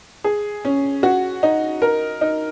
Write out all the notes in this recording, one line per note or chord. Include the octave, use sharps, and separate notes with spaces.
G#4
C#4
F#4
D#4
A#4
D#4